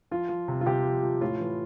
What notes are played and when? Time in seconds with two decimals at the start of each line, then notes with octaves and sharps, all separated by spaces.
0.11 F3 F4
0.29 F3
0.48 C3
0.61 F4
0.66 C3 G4
0.85 F3
1.03 F3
1.21 A2 F4
1.39 E3